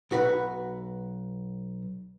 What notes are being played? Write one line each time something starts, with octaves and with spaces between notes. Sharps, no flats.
B1 F#4 B4 F#5